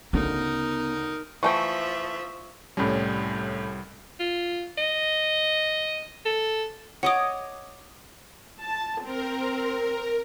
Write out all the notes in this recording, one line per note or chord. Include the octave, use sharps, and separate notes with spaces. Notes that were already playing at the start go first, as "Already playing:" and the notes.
D2 C#3 B3 D#4 A#4
E3 F3 A3 E5 G5 C#6
C2 A2 G3 C#4
F4
D#5
A4
C#5 D#5 F#5 D6 D#6
A5
C4 A#4